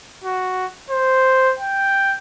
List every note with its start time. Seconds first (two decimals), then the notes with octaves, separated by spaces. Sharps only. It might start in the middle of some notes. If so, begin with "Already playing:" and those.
0.24 F#4
0.90 C5
1.59 G5